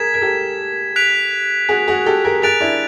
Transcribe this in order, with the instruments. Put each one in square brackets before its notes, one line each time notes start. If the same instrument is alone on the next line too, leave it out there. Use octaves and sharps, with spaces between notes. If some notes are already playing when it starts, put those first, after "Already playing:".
Already playing: [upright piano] G#4 A#4 [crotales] G#6 B6 E7
[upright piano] A#4
G4 A4
[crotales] F#6 B6 D7 F7
[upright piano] F#4 G#4
F#4 G#4
G4 A4
G#4 A#4
[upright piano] G#4 A#4 [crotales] F#6 A6 D7 F7
[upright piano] D4 E4